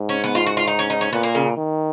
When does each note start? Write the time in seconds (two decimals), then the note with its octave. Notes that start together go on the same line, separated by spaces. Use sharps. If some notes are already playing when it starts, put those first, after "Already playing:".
Already playing: G#2
0.09 C#4
0.24 B3
0.35 F4
0.46 F#4
0.57 F4
0.67 D#4
0.79 C#4
0.90 D#4
1.01 C#4
1.12 A#2 B3
1.23 A#3
1.35 C#3
1.57 D#3